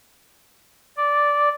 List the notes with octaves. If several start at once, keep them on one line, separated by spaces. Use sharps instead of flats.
D5